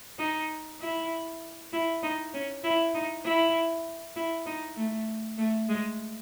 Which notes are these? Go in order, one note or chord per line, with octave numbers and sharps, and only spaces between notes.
D#4
E4
E4
D#4
C#4
E4
D#4
E4
E4
D#4
A3
A3
G#3